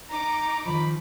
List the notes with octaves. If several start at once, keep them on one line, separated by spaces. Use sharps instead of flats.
D#4 A#5 D6
D#3 F3 B5